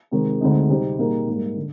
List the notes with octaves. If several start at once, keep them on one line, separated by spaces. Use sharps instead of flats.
C3 D#3 G#3 C4
D2 D3 G#3 C4 D#4
C3 G3 C4 D#4 G4
A#2 G3 A#3 D#4 G#4
G#2 G3 A#3
D3